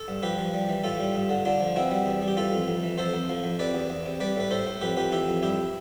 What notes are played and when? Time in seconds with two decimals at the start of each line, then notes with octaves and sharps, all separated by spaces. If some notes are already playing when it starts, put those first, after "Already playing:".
Already playing: A4
0.08 G2
0.23 F3 G4 B4
0.38 F3
0.54 G3
0.69 E3
0.84 A2 F4 A4
1.00 G3
1.15 G2
1.29 D3
1.45 D3 D4 F4
1.61 F3
1.76 B2 C4 E4
1.91 G3
2.06 E2
2.22 G3
2.28 G4
2.37 E3 F4 A4
2.52 F2
2.68 F2
2.83 E3
2.98 F2 A4 C5
3.14 F2
3.29 F3
3.44 F2
3.59 C3 B4 D5
3.74 E2
3.90 E2
4.05 C3
4.20 G3 B4 D5
4.36 A2 B4
4.51 A2 A4 C5
4.67 A2
4.81 F2 G4 B4
4.97 F2 G4 B4
5.12 E3 E4 G4
5.28 F2
5.43 G2 E4 G4